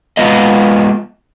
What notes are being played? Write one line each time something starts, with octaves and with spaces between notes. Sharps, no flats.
G#3 B3 F4 B4 D#5